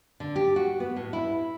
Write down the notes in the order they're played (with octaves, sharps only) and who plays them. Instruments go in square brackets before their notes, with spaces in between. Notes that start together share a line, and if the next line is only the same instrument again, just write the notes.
[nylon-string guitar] D3
G4
F#4
B3
A2
E4